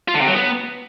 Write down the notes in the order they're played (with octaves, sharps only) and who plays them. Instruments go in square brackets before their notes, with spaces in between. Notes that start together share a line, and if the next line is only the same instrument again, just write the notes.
[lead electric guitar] F4
D3
C3
F#3
B3